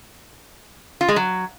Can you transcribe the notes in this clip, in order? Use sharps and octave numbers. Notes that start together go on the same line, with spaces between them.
F4
G#3
F#3